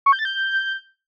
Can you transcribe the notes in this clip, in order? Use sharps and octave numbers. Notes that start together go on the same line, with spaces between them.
C#6
G6
A6
G6